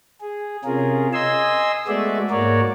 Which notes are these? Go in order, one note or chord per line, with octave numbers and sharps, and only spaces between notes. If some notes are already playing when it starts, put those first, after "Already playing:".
G#4
C3 C#4 F4 G#4 A#4
D#5 G#5 C6 E6
G#3 A3 B3 F#4 D5 E5
G#2 A#3 F#4 A#4 C#5 D5